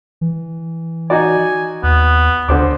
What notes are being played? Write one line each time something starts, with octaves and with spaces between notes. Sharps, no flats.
E3
D#4 F#4 D5 G#5
D#2 B3
D2 D3 C5 D6